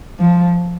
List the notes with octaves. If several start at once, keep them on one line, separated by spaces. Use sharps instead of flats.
F3